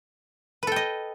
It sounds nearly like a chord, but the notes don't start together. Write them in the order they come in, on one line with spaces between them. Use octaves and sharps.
B4 A4 G5 D#5